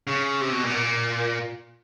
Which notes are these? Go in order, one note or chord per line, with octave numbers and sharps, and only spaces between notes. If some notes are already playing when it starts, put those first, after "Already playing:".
C#3
C3
B2
A#2
B2
A#2